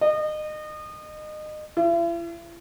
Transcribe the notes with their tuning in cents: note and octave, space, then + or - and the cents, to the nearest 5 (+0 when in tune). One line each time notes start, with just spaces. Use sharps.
D#5 -30
E4 +45